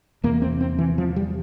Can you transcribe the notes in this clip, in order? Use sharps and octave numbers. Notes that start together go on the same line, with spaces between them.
E2 C3 A#3
C4
C4
E3
F3
G3